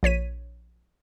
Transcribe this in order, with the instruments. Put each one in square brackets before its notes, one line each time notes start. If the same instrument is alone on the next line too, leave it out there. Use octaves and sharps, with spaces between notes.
[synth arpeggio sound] A#1 C#5 B6 D#7